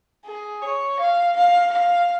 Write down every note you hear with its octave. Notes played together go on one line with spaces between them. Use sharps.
G#4
C#5
F5
F5
F5